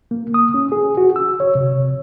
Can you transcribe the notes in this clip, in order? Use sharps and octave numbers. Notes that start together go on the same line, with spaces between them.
A#3
D#6
C#4
G#4
F#4
E6
C#5
C3